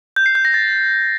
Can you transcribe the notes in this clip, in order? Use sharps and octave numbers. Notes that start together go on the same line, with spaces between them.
G6
C7
G6
A#6
A6